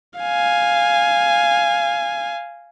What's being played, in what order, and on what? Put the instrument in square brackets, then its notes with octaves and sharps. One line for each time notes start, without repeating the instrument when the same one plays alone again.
[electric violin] F5 G#5